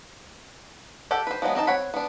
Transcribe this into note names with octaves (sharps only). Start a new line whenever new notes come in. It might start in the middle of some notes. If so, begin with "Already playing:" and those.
G4 A4 F#5
B4 C5
F3 F#3 G#3 B3
C4 D#4 F#4 A5
C4 C#5 F#5 B5
B3 D4